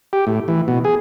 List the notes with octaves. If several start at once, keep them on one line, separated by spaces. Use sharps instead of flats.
G4
A2
E3
B2
G#4